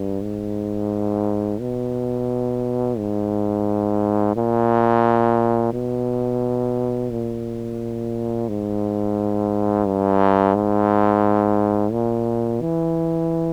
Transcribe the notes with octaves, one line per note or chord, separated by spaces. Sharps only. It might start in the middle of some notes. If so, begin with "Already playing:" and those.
Already playing: G2
G#2
B2
G#2
A#2
B2
A#2
G#2
G2
G#2
A#2
E3